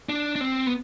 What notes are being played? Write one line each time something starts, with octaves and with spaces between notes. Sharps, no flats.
D4
D4
C4
B3